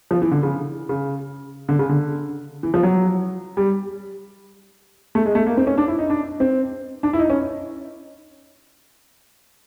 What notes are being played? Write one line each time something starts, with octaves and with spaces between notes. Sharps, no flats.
F3
E3
D3
C#3
C#3
D3
C#3
D3
E3
F3
F#3
G3
A3
G#3
A3
A#3
C4
C#4
D4
E4
D#4
D4
C4
D4
E4
D#4
C#4